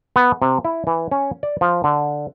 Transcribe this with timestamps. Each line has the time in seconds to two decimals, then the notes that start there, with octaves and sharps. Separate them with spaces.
0.16 B3
0.42 C3
0.65 E4
0.87 E3
1.11 C#4
1.43 D5
1.61 F3
1.84 D3